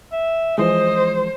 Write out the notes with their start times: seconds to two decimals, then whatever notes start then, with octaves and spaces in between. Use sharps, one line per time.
0.12 E5
0.58 E3 F3 G#3 C5 D#5